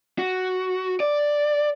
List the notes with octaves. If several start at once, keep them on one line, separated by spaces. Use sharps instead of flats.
F#4
D5